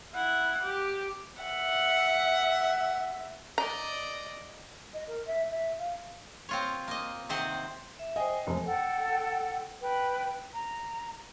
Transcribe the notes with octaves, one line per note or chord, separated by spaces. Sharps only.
E4 F#5
G4
E5 F#5
D5 D#5 A#5
D#5
A#4
E5
E5
F5
C4 F4 C#5
A#3 D#5
C3 D#3 C4 C5 D#5 F#5
E5
C5 D#5 G5 G#5
F1 A3
A4 F#5 G5
B4 G5
A#5